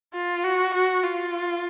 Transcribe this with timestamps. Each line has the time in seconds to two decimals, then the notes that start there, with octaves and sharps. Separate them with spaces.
0.14 F4
0.44 F#4
0.74 F#4
1.03 F4